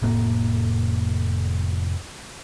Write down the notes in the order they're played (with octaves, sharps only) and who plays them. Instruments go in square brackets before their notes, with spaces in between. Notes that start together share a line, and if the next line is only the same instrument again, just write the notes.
[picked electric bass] F1 A2 A#3